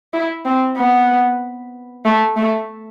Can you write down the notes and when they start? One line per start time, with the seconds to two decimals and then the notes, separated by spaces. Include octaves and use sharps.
0.14 E4
0.45 C4
0.77 B3
2.05 A3
2.37 A3